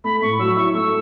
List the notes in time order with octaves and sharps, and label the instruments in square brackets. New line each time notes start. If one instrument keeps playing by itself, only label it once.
[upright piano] A3 [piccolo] B5
[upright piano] A2 [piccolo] C#6
[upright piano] F#3 [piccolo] E6
[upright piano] E4 [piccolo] C#6
[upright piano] A3 [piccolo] E6